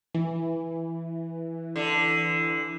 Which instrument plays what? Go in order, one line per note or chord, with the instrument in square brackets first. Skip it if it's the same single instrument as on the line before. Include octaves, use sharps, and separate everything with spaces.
[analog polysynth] E3
[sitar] D3